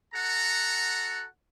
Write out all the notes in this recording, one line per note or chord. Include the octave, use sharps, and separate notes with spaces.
F#4 A4 F#5 A#5